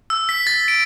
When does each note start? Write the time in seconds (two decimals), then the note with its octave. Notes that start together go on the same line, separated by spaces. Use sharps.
0.10 E6
0.29 B6
0.47 A6
0.68 D7